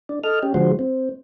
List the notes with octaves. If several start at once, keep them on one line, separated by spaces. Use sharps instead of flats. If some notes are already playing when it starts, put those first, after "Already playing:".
D4
A4 D#5 F6
C#4 G4
D3 F3 G#3 F#4 C5
C4